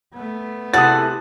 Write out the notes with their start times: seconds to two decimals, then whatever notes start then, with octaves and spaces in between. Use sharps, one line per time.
0.14 A3 B3
0.74 C3 E4 F#4 G#4 A4 F#5 D#6 A6